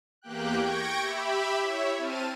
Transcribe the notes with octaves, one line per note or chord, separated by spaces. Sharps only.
E2 A#3 G4 G5 F#6
G5 C#6 G#6 A#6 D7
G4 E5 B5
E4 C#5 E5
C4 A5 F6 D#7